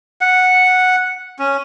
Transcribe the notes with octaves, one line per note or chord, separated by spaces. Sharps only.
F#5
C#4